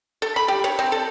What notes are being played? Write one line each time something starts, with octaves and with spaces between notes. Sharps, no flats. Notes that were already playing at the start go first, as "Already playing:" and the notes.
A4
B5
G4
C#5
C4
A4